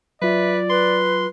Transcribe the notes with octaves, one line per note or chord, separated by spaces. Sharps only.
F#3 F4 B4 D5 E5
B4 C6